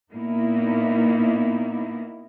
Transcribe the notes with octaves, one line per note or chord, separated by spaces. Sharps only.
A#2 A#3 B3 D#4 E4